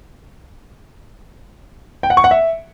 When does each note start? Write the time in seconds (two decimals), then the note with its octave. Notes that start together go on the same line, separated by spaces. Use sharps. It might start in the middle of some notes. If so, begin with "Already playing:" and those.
2.03 G5
2.10 F#5
2.17 C#6
2.24 F#5
2.31 E5